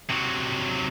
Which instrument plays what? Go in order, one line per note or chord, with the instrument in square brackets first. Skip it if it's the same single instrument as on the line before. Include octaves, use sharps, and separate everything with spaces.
[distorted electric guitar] C3 F#3